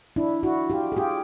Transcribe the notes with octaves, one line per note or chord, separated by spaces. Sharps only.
D4 E4
E4 F#4
F4 G4
G#4
F4 G4